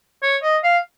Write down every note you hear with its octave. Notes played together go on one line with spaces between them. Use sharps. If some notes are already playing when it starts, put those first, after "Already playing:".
C#5
D#5
F5